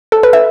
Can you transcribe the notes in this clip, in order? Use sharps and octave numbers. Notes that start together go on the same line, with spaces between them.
A4
B4
E5